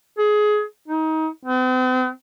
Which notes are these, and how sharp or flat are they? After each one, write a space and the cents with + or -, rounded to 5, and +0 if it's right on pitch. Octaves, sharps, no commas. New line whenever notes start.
G#4 +20
D#4 +25
C4 -45